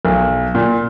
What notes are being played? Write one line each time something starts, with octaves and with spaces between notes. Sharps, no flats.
B1
A#2